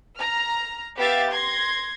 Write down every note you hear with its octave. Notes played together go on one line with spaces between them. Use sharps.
A#5 F6
B3 G4 E5 F5 A6
C6 G#6 A#6